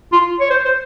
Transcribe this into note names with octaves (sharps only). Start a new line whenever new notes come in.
F4
C#5
C5
C5